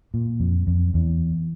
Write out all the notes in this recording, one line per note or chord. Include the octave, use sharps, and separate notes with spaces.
A#2
F2
F2
E2